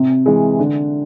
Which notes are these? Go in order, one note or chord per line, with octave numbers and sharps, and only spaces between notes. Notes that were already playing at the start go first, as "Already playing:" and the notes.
Already playing: C3
E3 G#3
D3